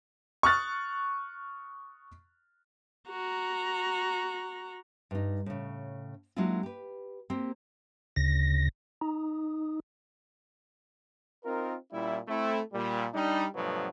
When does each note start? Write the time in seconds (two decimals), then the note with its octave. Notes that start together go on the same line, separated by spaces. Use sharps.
0.43 C#6 D#6 F6 F#6 A6
3.09 F#4 A#5
5.11 G2 D#4
5.46 A2 C#3
6.36 F#3 G#3 A#3 D4 E4 F4
6.63 G4 B4
7.30 A#3 C4 G4
8.16 D2 C#3 A#6
9.01 D#4
11.44 C4 D#4 F4 A#4
11.93 A#2 G3 C#4 E4
12.28 A3 C4 E4
12.74 A#2 G3
13.14 G3 D4 D#4
13.56 G2 B2 F3 F#3 A3 B3